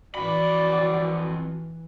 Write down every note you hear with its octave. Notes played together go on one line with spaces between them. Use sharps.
F2 E3 F#4 D5 B5